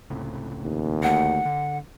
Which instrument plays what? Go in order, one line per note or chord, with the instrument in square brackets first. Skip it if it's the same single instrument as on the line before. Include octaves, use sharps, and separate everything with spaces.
[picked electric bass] C#2 A2 C3
[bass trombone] D#2
[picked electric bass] D2 A3 [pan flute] F#5
[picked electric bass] D3